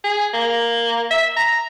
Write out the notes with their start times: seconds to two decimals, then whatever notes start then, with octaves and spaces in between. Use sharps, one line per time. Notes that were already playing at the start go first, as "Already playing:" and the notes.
0.04 G#4
0.33 A#3
1.11 E5
1.37 A#5